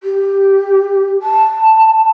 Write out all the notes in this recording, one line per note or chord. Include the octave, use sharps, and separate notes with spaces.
G4
A5